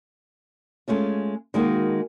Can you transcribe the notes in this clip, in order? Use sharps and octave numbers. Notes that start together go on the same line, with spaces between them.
G#3 A3 C#4 F4
D#3 G#3 A#3 D#4 F#4